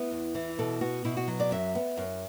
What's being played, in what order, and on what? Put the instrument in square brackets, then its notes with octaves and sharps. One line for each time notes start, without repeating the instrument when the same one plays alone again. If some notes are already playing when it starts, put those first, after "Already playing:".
Already playing: [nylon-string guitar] B3 E4
E2
E3
B2 A4
B3 F#4
B2 E4
F#4
F#3
D5
F#2 E5
B3
F#2